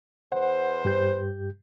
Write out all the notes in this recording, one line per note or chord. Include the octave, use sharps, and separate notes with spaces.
E2 B4 C5 F#5
G2 G4 G6